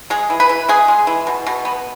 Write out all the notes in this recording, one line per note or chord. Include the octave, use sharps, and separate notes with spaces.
G#3 G#4
E3
B4
E3
G#3 G#4
G#3
E3
B2
B2
B3